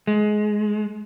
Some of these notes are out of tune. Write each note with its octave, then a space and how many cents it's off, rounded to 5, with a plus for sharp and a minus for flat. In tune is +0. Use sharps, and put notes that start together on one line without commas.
G#3 +20